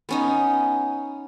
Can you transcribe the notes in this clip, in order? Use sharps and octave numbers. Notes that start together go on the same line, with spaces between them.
B3 C#4 D#4